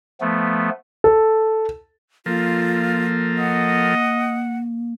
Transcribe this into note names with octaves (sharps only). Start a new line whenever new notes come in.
F3 A3 B3
A4
F3 A#3 F4 A4 A#4
D#5 F#5